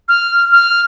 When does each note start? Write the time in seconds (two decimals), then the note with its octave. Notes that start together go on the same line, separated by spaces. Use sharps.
0.09 F6
0.52 F6